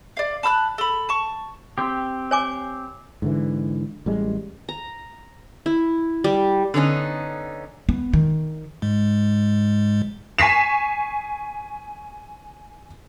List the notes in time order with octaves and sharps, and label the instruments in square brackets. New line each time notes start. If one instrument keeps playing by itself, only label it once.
[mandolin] D5 F5
A5 B5 E6 F#6
A4 B5
A5 C#6
[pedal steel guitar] C4 G4
[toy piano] C#5 G#5 D6
[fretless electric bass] G#2 D3 E3
A1 G3 G#3
[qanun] A#5
E4
G3
[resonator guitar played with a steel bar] D3 B3 C#4 D#4
[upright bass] B3
D#3
[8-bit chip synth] G#2 G#3
[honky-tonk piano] G#5 C#6 B6 C7 E7